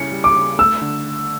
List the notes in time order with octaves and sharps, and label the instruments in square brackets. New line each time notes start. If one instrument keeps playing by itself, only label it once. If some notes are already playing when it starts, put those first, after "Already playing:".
Already playing: [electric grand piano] C#3 G3 C#4 E4 [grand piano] C#7
[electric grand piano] G3
[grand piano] D6
[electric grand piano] C#3
[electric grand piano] A3 [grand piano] E6
[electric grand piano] D3